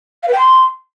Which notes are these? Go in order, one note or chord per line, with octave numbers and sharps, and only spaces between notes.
F5
B4
G5
C6